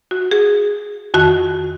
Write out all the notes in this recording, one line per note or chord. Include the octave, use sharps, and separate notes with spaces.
F#4
G#4
F2 D#3 F#4